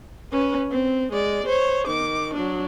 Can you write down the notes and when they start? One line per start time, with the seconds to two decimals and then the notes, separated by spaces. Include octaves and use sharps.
0.32 C#4 B4
0.71 C4
1.12 G#3 D5
1.46 C5 C#5
1.87 D#3 D6
2.34 F#3 D4